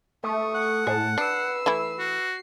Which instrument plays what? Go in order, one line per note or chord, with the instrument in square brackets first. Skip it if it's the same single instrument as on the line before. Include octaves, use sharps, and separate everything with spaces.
[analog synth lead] A3 [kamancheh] C#6 D#6
[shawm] F#5
[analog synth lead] A2 [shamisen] G#4 [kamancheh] A5
[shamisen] D4 [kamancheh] B4 E6 [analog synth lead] C7
[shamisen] E3 A3 E4
[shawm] F#4